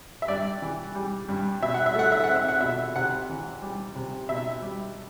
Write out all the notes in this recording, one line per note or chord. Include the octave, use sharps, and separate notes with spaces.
E5
G2 D5
E3
G3
G2
B2 E5
F#5
E5
A3 F#5
E5
C4 F#5
E5
F#5
B2 E5
C3 F#5
E3
G3
C3
B2 E5
G3